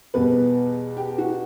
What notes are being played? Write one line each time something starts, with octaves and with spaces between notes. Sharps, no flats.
E2 B2 G3 B3 B4
G4
F#4